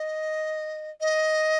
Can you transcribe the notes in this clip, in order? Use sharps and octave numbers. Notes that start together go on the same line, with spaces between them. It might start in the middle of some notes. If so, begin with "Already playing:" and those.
Already playing: D#5
D#5